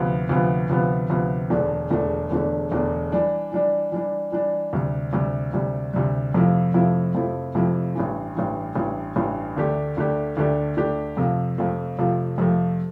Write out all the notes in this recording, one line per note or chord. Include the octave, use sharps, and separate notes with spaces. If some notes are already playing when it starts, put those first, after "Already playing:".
Already playing: D2 C3 F3 B3
D2 C3 F3 B3
D2 C3 F3 B3
D2 C3 F3 B3
E1 E2 D3 A3 D4
E1 E2 D3 A3 D4
E1 E2 D3 A3 D4
E1 E2 D3 A3 D4
E3 G3 D4
E3 G3 D4
E3 G3 D4
E3 G3 D4
D2 C3 G3
D2 C3 G3
D2 C3 G3
D2 C3 G3
F2 C3 F3 A3 E4
F2 C3 F3 A3 E4
F2 C3 F3 A3 E4
F2 C3 F3 A3 E4
A1 G2 E3
A1 G2 E3
A1 G2 E3
A1 G2 E3
D2 D3 A3 D4 G4
D2 D3 A3 D4 G4
D2 D3 A3 D4 G4
D2 D3 A3 D4 G4
F2 C3 F3 A3
F2 C3 F3 A3
F2 C3 F3 A3
F2 C3 F3 A3